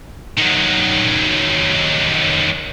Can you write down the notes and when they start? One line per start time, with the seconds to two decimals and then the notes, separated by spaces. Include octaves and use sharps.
0.37 D#3 F#3